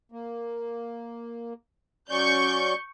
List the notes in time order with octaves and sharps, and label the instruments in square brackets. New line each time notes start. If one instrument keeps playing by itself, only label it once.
[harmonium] A#3
[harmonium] F#3 C#4 D5 [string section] C#6 G6